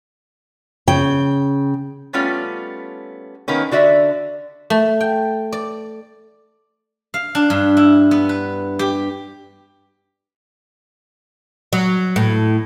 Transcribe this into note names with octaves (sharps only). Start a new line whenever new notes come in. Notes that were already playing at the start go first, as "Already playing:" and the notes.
C#3 G5
G3 A3 B3 C#4 F4
D#3 A#3 B3 C#4
D3 F#4 D5 E5
A3
G5
D5
F5
D4
G2
E4
B3
B4
G4
F#3
A2